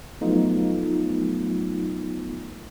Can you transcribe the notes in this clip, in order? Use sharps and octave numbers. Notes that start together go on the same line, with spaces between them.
F3 F#3 A3 B3 D#4 F4